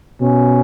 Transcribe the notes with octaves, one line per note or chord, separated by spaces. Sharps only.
B2 C#4